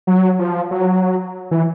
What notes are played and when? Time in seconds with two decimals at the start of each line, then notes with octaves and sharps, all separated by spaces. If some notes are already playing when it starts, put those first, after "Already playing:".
0.07 F#3
0.39 F3
0.71 F#3
1.51 E3